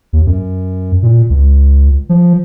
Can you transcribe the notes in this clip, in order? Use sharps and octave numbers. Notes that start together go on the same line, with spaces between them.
D#2
F#2
A#2
C#2
F3